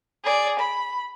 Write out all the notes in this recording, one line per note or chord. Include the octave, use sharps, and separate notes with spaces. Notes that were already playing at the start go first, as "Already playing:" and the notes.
G#4 D5
B5